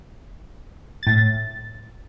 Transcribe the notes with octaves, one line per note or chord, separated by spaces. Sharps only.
A2 A6